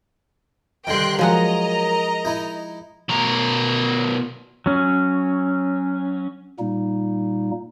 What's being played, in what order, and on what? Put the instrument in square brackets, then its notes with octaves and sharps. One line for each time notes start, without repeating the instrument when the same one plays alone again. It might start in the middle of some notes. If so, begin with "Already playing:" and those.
[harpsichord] G2 D3 D#3 [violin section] G5 C6 F#6
[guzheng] F3 G#3 F#5 [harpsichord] F#3 [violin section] A#4 D#5 A#5
[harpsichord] D#4 E4
[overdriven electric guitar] B2 A#4
[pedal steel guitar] F#3 C#4
[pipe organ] A#2 G3 A#3 D#4